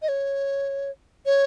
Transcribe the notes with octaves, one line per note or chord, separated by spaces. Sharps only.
D#5
C#5
C#5